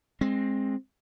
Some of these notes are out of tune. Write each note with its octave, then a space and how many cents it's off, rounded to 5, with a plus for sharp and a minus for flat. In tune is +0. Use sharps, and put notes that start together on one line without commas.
G#3 +0 C4 +20